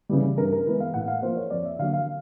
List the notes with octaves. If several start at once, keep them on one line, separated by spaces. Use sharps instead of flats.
C#3 E3 G3
G2 A#4
A#4
E3 G#3 B3 B4
F5
A2 F#5
F5
F3 A#3 C5
C#5
F2 D5
E5
D3 F#3 A#3 F5
F5